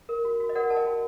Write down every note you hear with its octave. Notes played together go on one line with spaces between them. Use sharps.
A#4
F#4
F#4
D#5
A#4 D5 F#5
A#4 A5
D#5 G5
F#4